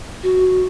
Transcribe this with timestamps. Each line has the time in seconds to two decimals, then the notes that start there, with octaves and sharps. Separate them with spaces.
0.23 F#4